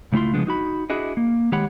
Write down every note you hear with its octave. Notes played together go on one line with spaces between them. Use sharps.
C#2 A3 E4 F4 C6
C#3 F3 G#3 B3 D4
D#4 F#4 B5
D4 E4 F#4 G#4 D#5
A#3
D#3 G#3 G4 C#5 F#5 B5